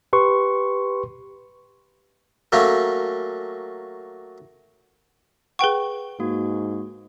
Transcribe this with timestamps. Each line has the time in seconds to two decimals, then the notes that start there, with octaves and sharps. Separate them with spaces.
0.13 G4 B4 C6 C#6
2.52 F#3 A3 A#3 C#4
5.59 G#4 B4 F#5 G5 C#6
6.20 G#2 A#3 F#4